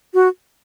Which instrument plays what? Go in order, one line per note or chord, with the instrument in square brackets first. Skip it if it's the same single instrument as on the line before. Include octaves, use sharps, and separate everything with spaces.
[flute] F#4